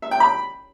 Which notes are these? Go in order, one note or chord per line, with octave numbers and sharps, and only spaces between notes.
E5
G5
B5